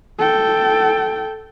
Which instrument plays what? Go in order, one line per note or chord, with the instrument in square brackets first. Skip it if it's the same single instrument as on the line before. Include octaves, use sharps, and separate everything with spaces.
[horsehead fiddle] A4 G5